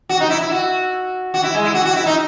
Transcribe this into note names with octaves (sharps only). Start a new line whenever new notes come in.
F#4
D#4
E4
E4
F#4
F#4
E4
G#3
E4
F#4
F#4
E4
D#4